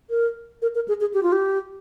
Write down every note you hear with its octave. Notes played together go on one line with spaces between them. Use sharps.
A#4
A#4
A#4
G#4
G#4
G4
F4
G4